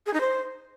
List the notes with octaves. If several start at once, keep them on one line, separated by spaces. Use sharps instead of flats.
G#4
D#4
C5